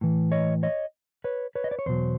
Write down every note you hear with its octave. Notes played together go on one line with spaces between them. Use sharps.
A2 E3
C#5 D#5
C#5 D#5
B4 C#5
B4 C#5
D#5
D5
C#5
E2 B2 F#3 C5